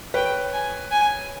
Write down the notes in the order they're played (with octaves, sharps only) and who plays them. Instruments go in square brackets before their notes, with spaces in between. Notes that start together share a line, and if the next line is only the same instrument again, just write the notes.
[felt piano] B4 C#5 [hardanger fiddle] G5
[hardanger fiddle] G#5
G#5